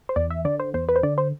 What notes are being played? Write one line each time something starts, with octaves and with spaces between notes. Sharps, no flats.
C5
E2 D5
E5
D3 D5
C5
E2 C5
B4
C5
D3 D5
C5